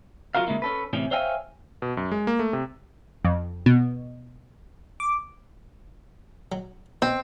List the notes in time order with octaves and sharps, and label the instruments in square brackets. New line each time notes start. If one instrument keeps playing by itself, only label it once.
[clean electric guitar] F#3 G3 F4 F#4 A#4 F5
C#3 G#3 A#3 E4
C#4 A4 B4
A2 C3 E3 C#4
C5 C#5 E5 F5 G5 G#5
[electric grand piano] B2
F#2
G#3
A#3
A3
C3
[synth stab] F2
B2
D6
[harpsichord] F#3
[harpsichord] B2 B3 [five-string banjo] C4